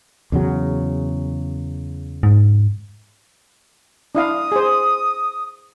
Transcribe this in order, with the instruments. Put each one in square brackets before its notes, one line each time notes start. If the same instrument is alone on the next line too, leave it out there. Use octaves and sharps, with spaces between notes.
[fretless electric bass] E2 C#3 F#3
[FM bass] G#2
[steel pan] D4 E4 F5 [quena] D#6
[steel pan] G#4 C5